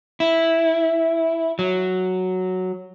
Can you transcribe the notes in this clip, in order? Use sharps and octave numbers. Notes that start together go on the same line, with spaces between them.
E4
F#3